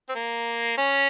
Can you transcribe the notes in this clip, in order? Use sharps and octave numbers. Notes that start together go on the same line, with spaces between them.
C4
A#3
C#4